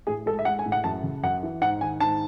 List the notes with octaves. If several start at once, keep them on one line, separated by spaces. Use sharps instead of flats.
A2 G#4
G#3 A4
E5
G#3 F#5
G#5
A2
F#5
F#2 A5
C#3
F#2 F#5
E3
G#2 F#5
D#3 G#5
G#2 A5